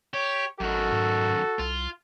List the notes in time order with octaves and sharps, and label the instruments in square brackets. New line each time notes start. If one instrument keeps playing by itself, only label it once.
[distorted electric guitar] G4 [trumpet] C#5
[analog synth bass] G#1 [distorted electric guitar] F#2 D#3 [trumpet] F#4 [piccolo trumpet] A4
[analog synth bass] G#2
[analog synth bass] C2 [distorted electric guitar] F4